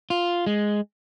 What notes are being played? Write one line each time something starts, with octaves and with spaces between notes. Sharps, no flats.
F4
G#3